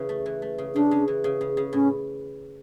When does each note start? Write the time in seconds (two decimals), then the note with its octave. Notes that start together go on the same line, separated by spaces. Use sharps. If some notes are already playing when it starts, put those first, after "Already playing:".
Already playing: C#3 E3
0.09 A3
0.26 E3
0.42 A3
0.58 C#3
0.75 C#3 D4
0.91 C#3
1.08 E3
1.24 C#3
1.41 C#3
1.57 C#3
1.73 A2 C#4